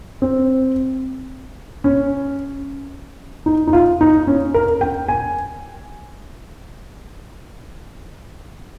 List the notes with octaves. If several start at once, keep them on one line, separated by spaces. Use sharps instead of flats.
C4
C#4
D#4
D#4
F4
D#4
C#4
A#4
G5
G#5